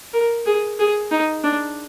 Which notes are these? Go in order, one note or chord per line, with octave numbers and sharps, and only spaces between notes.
A#4
G#4
G#4
D#4
D4